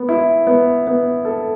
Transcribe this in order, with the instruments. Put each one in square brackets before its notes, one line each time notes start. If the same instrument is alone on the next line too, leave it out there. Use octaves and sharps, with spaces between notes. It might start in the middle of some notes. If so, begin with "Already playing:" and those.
Already playing: [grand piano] B3
E4
B3
B3
A4